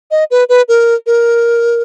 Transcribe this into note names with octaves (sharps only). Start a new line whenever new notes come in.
D#5
B4
B4
A#4
A#4